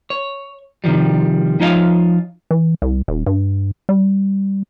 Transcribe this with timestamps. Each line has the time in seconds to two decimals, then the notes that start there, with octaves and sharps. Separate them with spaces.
0.10 C#5
0.84 C3 D#3 F3 G3
1.60 F3 D#4 F4 C#5 D#5 F5
2.51 E3
2.82 C2
3.08 D#1
3.26 G2
3.89 G3